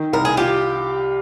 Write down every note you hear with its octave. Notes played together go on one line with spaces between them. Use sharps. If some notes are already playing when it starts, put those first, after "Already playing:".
Already playing: D#3
C2 A#4
G#4
F4 G4